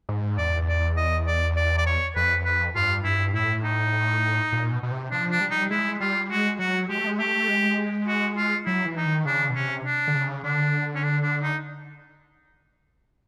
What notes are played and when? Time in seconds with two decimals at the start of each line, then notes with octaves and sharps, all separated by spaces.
0.09 G#2
0.38 E2 D5
0.68 D5
0.97 D#5
1.27 D5
1.56 D5
1.78 D5
1.86 C#5
2.15 F2 B4
2.45 B4
2.75 G2 F4
3.04 G2 E4
3.34 A2 E4
3.64 D#4
4.52 A#2
4.72 B2
4.83 B2
4.91 C3
5.11 F3 D4
5.31 D4
5.41 G3
5.51 D#4
5.70 G#3 E4
6.00 G3 F4
6.30 G#3 F#4
6.59 F#3 F#4
6.89 G#3 G4
6.98 A3
7.07 G#3
7.19 A3 G4
7.48 G#3
8.07 F#4
8.37 F4
8.66 F#3 E4
8.86 E3
8.97 D#4
9.06 D#3
9.25 C#3 D4
9.50 B2
9.55 C3 C#4
9.85 D4
10.07 D3
10.15 C#3
10.44 D3 D4
10.95 C#4
11.03 D4
11.23 D4
11.42 D#4